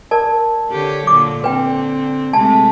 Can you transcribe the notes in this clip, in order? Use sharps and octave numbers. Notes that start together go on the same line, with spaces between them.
A#4 D5 A5
D3 G4 C#5
A#2 D3 F#3 D6
D3 C4 B4 G5
C3 G#3 A3 A5